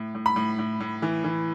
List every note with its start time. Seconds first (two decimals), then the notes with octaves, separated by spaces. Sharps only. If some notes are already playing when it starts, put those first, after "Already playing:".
Already playing: A2
0.15 A2
0.26 B5
0.36 A2
0.59 A2
0.80 A2
1.02 E3
1.24 E3